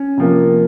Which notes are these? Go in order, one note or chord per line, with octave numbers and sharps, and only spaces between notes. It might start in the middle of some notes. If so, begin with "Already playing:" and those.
Already playing: C#4
C3 F3 A#3